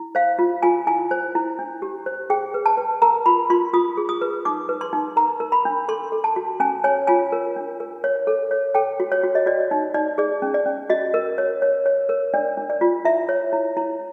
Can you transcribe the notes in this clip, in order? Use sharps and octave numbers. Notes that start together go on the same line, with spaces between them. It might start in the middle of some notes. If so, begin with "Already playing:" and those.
Already playing: E4
C5 F5
F4
F4 G#5
E4 G#5
C5
E4
D4
G4
C5
G#4 G5
B4
A5
B4
A#4 A#5
F4 B5
F4 C6
F4 D#6
G#4
D#6
B4
D#4 D6
B4
C6
D#4
A#4 A#5
A#4
B5
D4
A4 C6
A4
A5
F#4
C#4 G#5
C#5 G#5
F4 G#5
A#4
D4
A#4
C#5
A4
C#5
A4 G5
F#4
C#5
F#4
D#5
F#4 D5
D#4
D#4 D5
G#4 D5
C#4
D5
C#4
F#4 D#5
A#4
C#5
C#5
C#5
A#4
D4 D5
D4
D5
F4
E4 E5
C#5
E4
E4